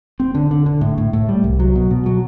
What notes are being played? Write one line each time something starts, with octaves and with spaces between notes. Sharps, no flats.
C4
D3
D3
D3
A2
A2
A2
G3
C2
F#3
B2
B2
F#3